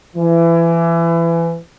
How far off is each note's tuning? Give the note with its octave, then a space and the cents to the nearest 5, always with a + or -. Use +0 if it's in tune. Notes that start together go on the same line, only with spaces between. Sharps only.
E3 +25